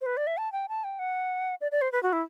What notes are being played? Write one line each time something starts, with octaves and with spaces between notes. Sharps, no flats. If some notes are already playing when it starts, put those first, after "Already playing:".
C5
B4
D5
E5
A5
G5
A5
G5
F#5
D5
D5
C5
B4
F#4
E4